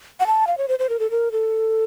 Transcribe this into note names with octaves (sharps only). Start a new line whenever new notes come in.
F#5
A5
F5
C#5
C5
C5
A#4
A4
A#4
A4